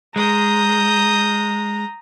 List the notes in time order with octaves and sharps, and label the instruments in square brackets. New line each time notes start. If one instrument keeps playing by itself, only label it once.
[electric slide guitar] G#3 [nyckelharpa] A#5 [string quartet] D#6 G6